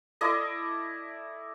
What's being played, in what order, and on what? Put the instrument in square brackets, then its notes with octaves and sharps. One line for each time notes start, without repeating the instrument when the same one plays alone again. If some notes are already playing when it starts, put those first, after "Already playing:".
[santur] E4 A4 D5 D#5